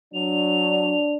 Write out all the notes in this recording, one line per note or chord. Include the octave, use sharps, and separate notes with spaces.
F#3 D4 F7